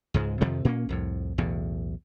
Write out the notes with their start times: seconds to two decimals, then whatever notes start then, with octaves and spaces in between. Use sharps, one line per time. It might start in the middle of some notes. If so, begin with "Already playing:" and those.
0.14 C#2 G#2 G#3
0.41 F2 C3 D#3 F3
0.65 A#2 A#3 C4 C#4
0.89 C2 F2 A2
1.38 B1 E2 A2